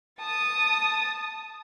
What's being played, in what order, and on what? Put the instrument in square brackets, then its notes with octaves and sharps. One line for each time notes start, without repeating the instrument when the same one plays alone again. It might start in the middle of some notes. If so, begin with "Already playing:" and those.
[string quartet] A5 D#6